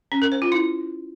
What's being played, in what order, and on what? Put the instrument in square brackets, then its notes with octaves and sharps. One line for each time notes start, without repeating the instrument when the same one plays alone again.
[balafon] C#4
A#4
C5
F4
E4